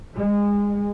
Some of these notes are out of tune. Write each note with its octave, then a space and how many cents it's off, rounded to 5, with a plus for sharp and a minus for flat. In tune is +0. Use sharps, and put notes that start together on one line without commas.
G#3 -25